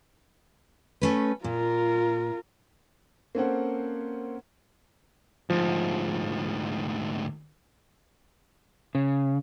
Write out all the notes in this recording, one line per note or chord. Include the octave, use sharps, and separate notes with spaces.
A3 C#4 B4
A#2 F4 A#4
A#3 C4 C#4 A4 C5 F#5
D2 G#2 F3
C#3